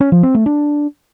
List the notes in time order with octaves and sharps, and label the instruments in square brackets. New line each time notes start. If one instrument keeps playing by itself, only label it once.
[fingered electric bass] C#4
F3
C4
A3
D4